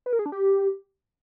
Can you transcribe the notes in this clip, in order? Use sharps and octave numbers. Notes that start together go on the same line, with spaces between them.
B4
A#4
G#4
D4
G4